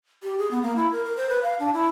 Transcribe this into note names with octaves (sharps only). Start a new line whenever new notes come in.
G4
G#4
B3
A#3
E4
A#4
A#4
C5
B4
F5
D4
E4